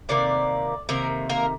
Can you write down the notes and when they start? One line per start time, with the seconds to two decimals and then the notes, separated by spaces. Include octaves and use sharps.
0.09 C3 D#3 A#3 D5
0.89 C3 D#3 A#3 A#4
1.29 A#3 A#4